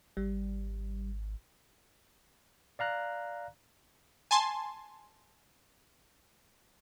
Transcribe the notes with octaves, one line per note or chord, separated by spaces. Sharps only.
G#1 G3
D5 F5 A#5 F#6
G#5 A5 C6